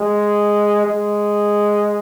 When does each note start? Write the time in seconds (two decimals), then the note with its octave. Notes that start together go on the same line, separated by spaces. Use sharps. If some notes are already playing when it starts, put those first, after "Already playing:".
Already playing: G#3
0.86 G#3